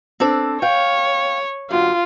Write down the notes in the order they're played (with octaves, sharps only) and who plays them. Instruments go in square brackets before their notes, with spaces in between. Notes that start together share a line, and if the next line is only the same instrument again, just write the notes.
[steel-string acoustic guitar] C4 D4 A4
[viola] C#5 [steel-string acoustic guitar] F5 G5
[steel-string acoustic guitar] F#2 D3 [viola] F4